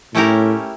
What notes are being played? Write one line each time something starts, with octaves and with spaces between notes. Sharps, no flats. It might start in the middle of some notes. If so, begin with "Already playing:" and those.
A2 A3 C#4 E4 G4 A#4